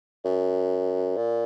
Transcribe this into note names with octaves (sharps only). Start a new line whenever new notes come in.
F#2
A#2